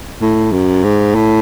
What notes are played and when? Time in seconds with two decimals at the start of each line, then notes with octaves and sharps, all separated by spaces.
0.21 A2
0.52 F#2
0.84 G#2
1.15 A2